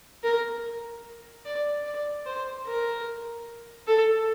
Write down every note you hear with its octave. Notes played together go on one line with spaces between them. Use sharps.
A#4
D5
D5
C5
A#4
A4